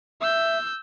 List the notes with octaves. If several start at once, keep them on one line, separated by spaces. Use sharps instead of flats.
E5 E6 G6